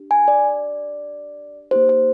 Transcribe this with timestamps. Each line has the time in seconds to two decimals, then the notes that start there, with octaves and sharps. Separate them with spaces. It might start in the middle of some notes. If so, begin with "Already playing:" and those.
Already playing: D4 G4
0.11 G#5
0.28 D5
1.71 A#3 D#4 G4 C5
1.89 C5